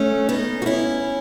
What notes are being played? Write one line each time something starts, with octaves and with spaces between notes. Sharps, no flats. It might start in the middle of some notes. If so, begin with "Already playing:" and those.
Already playing: A3 C#4
B3 D#4
F#4
C#4 E4